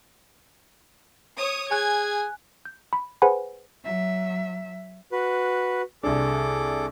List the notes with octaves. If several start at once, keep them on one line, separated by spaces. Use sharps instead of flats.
C#5 D#6
G#4 G#5 F#6 G#6
G6
B5
G#4 B4 C5 F#5 G#5 B5
F#3 E5
F#4 B4
C2 D4 G#4 A4 D6